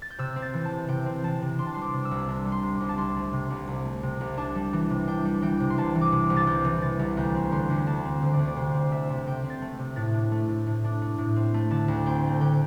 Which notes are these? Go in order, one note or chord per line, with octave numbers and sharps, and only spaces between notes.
A6
G6
C3 E6
C4
A6
E3
A5
C3
C3 G5
C4
E3 A5
C3
D4 C6
A5
G3 C6
D6
C3
E6
C2
D4 E6
G3
C6
C3
D6
C2
A5
C2 C6
A3
C3
C2
C2
A3
C3
C2
D4 A5
G3
E3
C3
D4 G5
G3
E3 G5
C3
C6
C2 A5
E3
D6
C3
C2
A6
C2 G6
E3
C3 A6
C2
D2 G6
C4
D3 C6
D2
D2 A5
C4
D3 C5
D5
D2
D5
C3 C5
C4
A3 E5
C3
C3 G5
C4
A6
A3
C3
A2 A6
D4
A3
A2
A2
D4
A3
A2
C4
A3
D3 A5
D2
C4 G5
A3
D3 G5